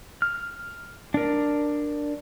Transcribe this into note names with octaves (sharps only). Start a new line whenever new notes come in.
F6
D4 A#4